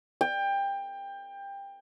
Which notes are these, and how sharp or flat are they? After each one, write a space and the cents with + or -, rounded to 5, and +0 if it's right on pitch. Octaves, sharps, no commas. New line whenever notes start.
G5 +20